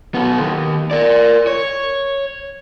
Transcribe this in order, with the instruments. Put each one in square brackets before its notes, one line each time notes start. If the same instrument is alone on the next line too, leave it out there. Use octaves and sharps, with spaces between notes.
[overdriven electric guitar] B1 B3
D#2 D#3
A#4 D5
C#5